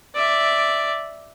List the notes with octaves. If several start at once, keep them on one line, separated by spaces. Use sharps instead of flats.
D5 E5